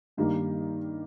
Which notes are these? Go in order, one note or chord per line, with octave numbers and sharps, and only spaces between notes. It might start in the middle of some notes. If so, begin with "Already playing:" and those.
G2 D#3 G3 A#3